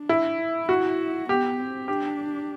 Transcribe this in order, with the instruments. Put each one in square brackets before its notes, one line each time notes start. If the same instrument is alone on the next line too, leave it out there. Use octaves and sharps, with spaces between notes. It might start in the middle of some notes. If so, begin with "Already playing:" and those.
Already playing: [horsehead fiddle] D4
[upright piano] E4
[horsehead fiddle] E4
[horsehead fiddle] E4 [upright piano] F#4
[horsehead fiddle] B3 [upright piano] G4
[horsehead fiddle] C4
[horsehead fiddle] D4 [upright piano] G4